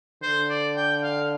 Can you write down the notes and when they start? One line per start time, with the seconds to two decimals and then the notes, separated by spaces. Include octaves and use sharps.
0.22 D3 C5
0.50 D5
0.76 G5
1.03 F5